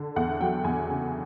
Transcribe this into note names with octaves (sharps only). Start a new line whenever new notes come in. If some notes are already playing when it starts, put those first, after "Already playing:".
Already playing: D3
E2 F#5
F#3 G5
E2 G#5
C#3